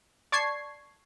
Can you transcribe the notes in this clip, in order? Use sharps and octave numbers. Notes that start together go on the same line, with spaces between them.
D5 A5 C#6 G#6 C7